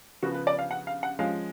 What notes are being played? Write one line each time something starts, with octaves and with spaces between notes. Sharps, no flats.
C#3 F3 B3 F#4
B4
D5
F5
F#5
F5
F#5
F3 G#3 C#4 F5